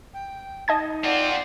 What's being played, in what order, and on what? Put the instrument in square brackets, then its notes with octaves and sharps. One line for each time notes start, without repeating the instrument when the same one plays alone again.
[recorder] G5
[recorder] D#4 [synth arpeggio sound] D#5 A5 G#6
[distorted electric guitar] C4 F4 [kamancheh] D5 F#5